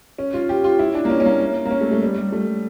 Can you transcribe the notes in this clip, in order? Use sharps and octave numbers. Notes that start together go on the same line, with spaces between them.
C#4
F4
G4
F4
E4
D4
A#3
C#4
C#4
A#3
A#3
C#4
A3
A3
G3
G3
A3